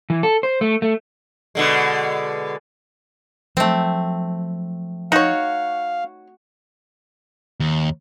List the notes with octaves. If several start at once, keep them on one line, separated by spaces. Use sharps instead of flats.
E3
A4
C5
A3
A3
B2 D3 G#3
F3 F#3 A3 C4
D#4 F#4 C#5 F5
D#2